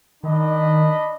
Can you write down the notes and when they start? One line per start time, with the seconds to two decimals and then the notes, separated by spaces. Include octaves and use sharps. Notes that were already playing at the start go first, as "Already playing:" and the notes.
0.23 D#3 D4 D#5 B5